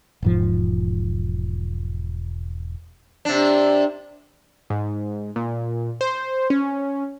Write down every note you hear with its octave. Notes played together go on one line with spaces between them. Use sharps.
E1 G#2 F3
C3 D4
G#2
A#2
C5
C#4